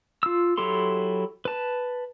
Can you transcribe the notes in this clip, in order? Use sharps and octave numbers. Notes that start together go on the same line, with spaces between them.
F4 E6
F#3 E4 G4 A4 C6
B4 A5